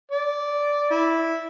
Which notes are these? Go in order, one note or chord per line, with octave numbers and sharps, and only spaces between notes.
D5
E4